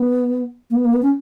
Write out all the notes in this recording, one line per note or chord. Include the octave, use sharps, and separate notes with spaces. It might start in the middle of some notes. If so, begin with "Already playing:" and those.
Already playing: B3
A#3
B3
A#3
B3
C#4